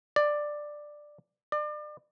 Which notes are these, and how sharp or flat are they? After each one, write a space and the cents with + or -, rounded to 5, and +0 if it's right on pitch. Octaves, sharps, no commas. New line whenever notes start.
D5 +10
D5 +35